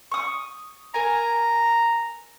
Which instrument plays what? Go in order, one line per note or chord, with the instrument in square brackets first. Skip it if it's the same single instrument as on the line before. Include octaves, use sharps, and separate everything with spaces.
[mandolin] C#6 D#6
[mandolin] A#4 G#5 [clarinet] A#5